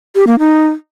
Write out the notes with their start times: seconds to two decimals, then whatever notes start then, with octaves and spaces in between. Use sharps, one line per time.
0.15 G4
0.27 A#3
0.39 D#4